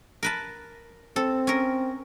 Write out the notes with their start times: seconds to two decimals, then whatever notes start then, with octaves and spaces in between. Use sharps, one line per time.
0.23 A#4 B4 A5
1.16 C4 A4
1.47 C#4 A#4